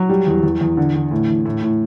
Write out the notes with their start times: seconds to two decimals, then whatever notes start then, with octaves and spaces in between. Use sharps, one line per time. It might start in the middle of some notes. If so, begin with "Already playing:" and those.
Already playing: F#3
0.09 G3
0.27 E2
0.43 E2
0.61 E2
0.77 D3
0.95 D3
1.11 A2
1.28 E3
1.45 A2
1.62 A2